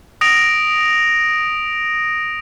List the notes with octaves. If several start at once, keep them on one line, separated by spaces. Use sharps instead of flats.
D#6 A#6 D7 F7